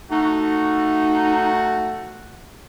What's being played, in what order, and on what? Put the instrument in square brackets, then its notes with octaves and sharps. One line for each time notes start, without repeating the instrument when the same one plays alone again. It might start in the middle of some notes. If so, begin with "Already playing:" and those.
[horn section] A3 F#4 [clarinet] D#4